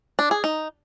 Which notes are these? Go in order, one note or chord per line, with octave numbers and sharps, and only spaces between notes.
D4
G#4
D#4